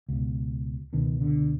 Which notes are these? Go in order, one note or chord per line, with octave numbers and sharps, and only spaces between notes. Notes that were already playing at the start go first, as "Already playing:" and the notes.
C#2 B2
C#2 B2 D#3
D3